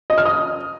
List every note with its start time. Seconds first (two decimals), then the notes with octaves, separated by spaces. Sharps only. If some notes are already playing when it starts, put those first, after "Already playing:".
0.10 D#5
0.18 F6
0.25 D#6